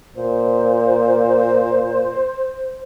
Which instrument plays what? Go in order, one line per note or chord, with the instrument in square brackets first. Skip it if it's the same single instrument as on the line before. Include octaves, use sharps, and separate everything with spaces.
[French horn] A#2 [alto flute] C5